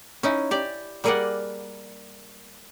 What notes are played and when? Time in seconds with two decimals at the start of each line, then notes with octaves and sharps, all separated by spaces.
0.23 C#4 D#4 E4
0.51 G4 D5
1.04 G3 A#3 G#4 A#4 D5 F#5